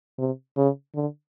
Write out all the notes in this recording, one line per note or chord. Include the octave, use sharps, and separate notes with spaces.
C3
C#3
D3